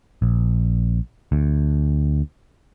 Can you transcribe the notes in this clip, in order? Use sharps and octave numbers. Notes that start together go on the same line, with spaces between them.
A#1
D2